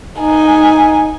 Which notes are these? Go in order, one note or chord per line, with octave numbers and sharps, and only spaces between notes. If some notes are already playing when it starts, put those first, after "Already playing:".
D#4 G#5